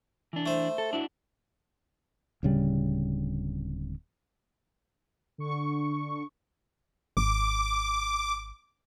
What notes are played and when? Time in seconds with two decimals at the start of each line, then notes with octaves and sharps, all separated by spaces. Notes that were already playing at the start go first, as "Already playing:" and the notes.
0.33 E3 D4
0.46 A3 C5
0.78 A4
0.93 D4 E4 F#4
2.43 D1 C#3 G3
5.38 D3 C#6
7.17 G#1 D6